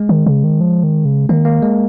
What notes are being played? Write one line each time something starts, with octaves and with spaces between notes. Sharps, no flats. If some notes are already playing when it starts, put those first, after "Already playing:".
Already playing: G#3
D#3
C#3
D#3
F3
D#3
C#3
D#3 A#3
A#3
G#3